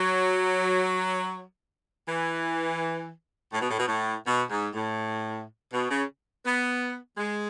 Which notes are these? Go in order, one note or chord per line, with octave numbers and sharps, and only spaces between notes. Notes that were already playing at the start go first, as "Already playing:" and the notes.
Already playing: F#3
E3
A2
B2
A2
B2
A2
B2
G#2
A2
B2
C#3
B3
G#3